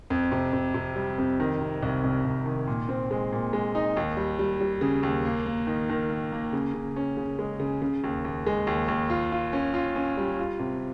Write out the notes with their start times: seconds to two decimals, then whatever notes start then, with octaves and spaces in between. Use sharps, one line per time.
0.10 F2
0.32 C3
0.53 C3
0.74 C3
0.96 G3
1.18 F2
1.40 D#3
1.60 C3
1.83 C2
2.04 C2
2.25 C2
2.46 D#3
2.67 A#2
2.89 C4
3.11 G#3
3.32 A#2
3.53 G#3
3.75 D#4
3.97 D#2
4.17 G3
4.39 G3
4.61 G3
4.81 C#3
5.03 D#2
5.25 A#3
5.46 A#3
5.67 D#3
5.90 D#3
6.10 A#3
6.32 A#3
6.53 C#3
6.74 C#3
6.96 C#4
7.17 C#3
7.39 G#3
7.60 C#3
7.82 C#3
8.04 D#2
8.25 D#2
8.47 G#3
8.67 D#2
8.88 D#2
9.10 F4
9.32 F4
9.53 C#4
9.74 F4
9.96 C#4
10.18 G3
10.39 F4
10.59 C3